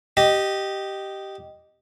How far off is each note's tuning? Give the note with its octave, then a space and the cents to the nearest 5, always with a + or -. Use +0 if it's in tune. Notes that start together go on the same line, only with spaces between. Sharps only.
G4 -10 D#5 -5